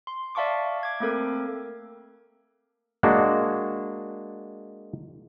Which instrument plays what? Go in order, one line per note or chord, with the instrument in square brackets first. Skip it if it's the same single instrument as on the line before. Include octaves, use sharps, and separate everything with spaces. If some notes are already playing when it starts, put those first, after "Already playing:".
[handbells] C6
D5 E5 F5 A5 C#6 D6
D6 G#6
A3 A#3 C4 A4 A#4
[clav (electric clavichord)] G#3 A#3 D4 F#4